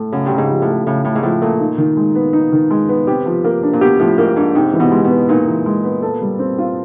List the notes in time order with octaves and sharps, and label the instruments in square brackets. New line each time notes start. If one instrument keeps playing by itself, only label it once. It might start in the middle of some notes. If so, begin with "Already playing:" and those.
Already playing: [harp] A2 [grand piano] A3
[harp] F#2 [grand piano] C#3
[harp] G2
[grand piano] C#3
[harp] G#2
[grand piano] F3
[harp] A2
[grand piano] A3
[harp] A2 [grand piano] C#3
[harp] A2 [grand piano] C#3
[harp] G#2
[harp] A2 [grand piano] F3
[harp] A#2 [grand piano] A3
[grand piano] D#4
D#3
G#3
B3
D#4
D#3
G#3
B3
[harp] C3 [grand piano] G4
[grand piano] F3
A#3
D4
[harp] A#2
[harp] B2 [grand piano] G4
[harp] A2 [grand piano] F3
[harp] G#2 [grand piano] A#3
[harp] G#2 [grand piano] D4
[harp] C3 [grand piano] D#4
[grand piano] E3
[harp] B2
[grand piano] G#3
[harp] B2
[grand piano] B3
[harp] A#2 [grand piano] D#4
[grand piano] E3
G#3
B3
A4
G3
C4
F4